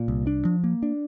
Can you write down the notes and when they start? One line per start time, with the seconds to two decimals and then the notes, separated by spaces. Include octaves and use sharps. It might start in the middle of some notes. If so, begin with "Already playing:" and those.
Already playing: A#2
0.08 C2
0.27 D4
0.45 F3
0.64 A#3
0.83 D4